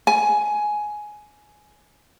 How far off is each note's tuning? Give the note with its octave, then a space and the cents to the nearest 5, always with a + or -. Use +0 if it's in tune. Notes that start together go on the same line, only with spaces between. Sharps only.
G#5 +10